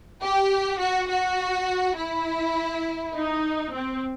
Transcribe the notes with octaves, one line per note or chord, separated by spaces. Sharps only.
G4
F#4
F#4
E4
D#4
C4